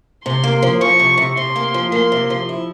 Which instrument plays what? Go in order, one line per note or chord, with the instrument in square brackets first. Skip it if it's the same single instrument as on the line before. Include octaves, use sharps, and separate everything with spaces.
[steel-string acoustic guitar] C3 [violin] C6
[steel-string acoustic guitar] A#3
F3
[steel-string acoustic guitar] F3 [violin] C#6
[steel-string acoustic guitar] C3
C3
[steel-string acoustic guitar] C3 [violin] C6
[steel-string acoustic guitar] A#3
F3
[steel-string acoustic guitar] A#3 [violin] C6
[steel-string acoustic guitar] C3
F3
E4